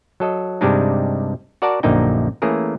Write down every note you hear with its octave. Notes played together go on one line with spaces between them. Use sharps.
F#3 A4 D#5
G2 C3 G3 G#3 D4 D#4
F#4 A#4 D5 F#5 A5
A#1 F#2 D3 A#3 D#4 G5
E3 A3 A#3 C#4 G#4 A#4